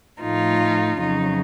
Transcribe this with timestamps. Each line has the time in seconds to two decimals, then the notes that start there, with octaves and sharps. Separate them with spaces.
0.21 A2 F3 A3 D#4 F4
0.98 F2 C#3 F#3 D#4